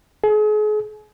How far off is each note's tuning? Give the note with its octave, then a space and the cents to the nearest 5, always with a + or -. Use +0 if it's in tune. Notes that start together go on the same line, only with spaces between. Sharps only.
G#4 +40